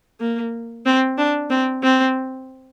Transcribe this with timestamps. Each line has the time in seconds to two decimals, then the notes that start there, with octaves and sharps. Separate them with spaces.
0.20 A#3
0.86 C4
1.18 D4
1.50 C4
1.83 C4